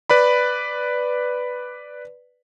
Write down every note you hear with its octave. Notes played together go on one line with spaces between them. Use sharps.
B4 D5 B5